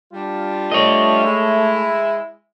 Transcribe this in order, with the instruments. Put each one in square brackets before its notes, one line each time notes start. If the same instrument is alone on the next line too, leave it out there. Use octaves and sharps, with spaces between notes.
[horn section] G3 D4 F4
[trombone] A3 [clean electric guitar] C#5 D#5
[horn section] G#3 E4